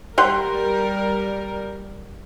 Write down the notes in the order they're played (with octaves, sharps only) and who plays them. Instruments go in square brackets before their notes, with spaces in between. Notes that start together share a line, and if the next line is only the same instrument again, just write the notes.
[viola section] G3 A#4 [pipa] G4 F#5 C6